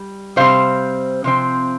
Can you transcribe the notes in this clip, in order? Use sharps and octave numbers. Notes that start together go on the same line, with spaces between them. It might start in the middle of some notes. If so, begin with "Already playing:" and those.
Already playing: G3
C3 G3 C4 C5 F5
C3 F3 C4